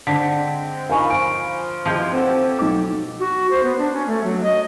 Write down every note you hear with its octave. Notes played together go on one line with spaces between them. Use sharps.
D3 G#3 C4 B6
D4 D#4 F4 A#4 F5 G#5 B5 C#6
F3 D7
E3 F3 G#3 G4 F5 G6 G#6
C4 C#4 G4 A4 F#5
B1 D6
F#4
C5
B3
D4
C#4
A3
F#3
D#5